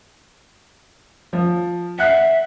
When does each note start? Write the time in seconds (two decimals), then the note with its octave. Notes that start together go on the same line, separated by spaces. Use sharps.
1.33 F3
1.99 E5 F#5 F#6 C7